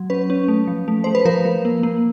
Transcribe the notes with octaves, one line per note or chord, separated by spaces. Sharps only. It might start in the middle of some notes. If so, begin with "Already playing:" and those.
Already playing: F#3
C#4 B4
C#4
A3
F3
A3
A3 C5
B4
F3 A#4
F3
A#3
A#3